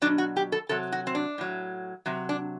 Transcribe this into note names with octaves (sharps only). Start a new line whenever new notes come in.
B2 F#3 D4
F#4
G4
A4
C3 F#3 A4
F#4
C4
D4
A2 F#3
C3 F#3
D4